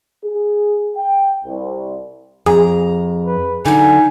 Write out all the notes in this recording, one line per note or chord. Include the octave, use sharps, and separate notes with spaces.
G#4
G5
C2
F2 G#4 A#5
B4
D3 F#3 D#4 G#5